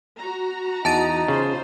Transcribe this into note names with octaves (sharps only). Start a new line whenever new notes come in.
F#4 A#5
E2 D#4 A5 A6 D#7
C#3 F4 C5